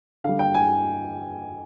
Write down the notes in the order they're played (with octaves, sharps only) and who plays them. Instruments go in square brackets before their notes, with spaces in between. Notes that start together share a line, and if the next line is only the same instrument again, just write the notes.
[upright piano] D3 G3 F5
G5
G#5